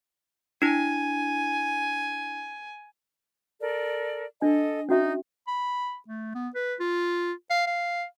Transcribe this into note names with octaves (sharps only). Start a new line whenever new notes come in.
D4 E4 G#5
A4 A#4 D5
D4 A4 D#5 G#5
C#4 D#4 F#4 E5
B5
A3
B3
B4
F4
F5
F5